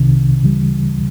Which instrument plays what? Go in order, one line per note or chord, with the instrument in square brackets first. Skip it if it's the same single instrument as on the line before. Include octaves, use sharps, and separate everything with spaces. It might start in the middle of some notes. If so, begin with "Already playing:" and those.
Already playing: [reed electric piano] C2 C3 D#3
D2 C#3 E3 G3